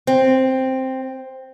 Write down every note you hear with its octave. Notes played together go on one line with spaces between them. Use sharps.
C4